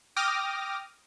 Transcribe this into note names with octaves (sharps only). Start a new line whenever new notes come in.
G5 D6 D#6 F6 A#6